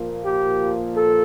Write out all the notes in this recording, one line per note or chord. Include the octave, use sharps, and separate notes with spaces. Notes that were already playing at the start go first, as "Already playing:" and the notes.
Already playing: A#2 F3 A#3
G4
A4